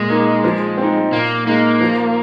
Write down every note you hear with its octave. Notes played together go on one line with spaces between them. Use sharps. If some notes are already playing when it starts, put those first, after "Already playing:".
Already playing: A#2 G#3
A#3 D#4
F3
C4 D#4
A#2 A#3
G#3 A#3 D#4
F3